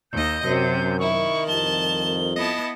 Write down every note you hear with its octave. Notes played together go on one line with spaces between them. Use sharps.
D#2 D#5 G6
F#2 C3
D#3 E4 C#6
C2 F2 A5 G7
B3 E4 D#5 A5